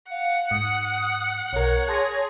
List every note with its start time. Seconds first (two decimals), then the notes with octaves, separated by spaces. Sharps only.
0.11 F5 F#5
0.51 G#2 D#6
1.53 B1 A#4 C#5
1.88 G#4 A5 C6 A#6